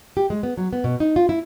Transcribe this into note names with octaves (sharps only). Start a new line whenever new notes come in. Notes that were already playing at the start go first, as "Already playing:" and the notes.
G4
G#3
B3
F#3
B3
B2
D#4
F4
E4